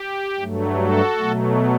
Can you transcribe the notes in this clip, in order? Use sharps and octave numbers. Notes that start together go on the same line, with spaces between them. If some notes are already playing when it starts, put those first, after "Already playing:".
Already playing: G4
G2 F#3 A3
F#4 A4
B2 F#3 A3